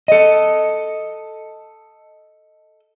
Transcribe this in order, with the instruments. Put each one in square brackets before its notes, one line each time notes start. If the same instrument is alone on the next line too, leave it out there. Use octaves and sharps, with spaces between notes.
[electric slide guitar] A4 D#5